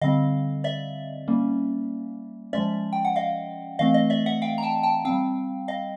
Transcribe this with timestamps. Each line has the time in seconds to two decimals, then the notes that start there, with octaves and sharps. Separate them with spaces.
0.02 D3 G3 C4 D#5 F5
0.64 D5 E5
1.28 G3 A#3 C#4
2.53 F3 G#3 C#4 D5 E5
2.93 G5
3.05 F#5
3.16 D#5 F5
3.79 E3 A3 C4 D#5 F5
3.94 D#5
4.10 D5 E5
4.26 E5 F#5
4.42 F5 G5
4.58 A#5
4.63 G5 A5
4.83 G5 A5
5.05 G3 C4 F5 G5
5.68 D#5 F5